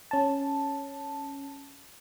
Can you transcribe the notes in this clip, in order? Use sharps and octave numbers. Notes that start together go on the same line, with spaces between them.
C#4 A5